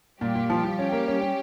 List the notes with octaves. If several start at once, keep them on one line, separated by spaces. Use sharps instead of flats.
A#2 G3 G4
A#2
F3
F3
C#4
A#3
C#4
C#4